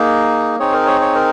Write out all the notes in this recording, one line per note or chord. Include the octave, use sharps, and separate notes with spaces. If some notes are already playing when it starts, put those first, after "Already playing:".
Already playing: A#3 D#4 G#4
C4 D#4 G#4 C#5
A#4
C#5
C#5
A#4